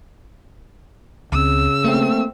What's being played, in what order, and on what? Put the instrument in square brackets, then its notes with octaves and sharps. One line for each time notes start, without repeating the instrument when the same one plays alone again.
[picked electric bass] C#2 C4 [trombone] C#3 [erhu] E6
[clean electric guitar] A3 C4 [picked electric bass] A#3